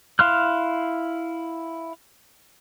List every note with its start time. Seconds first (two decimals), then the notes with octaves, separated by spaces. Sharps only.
0.19 E4 F5 C6 F6 F#6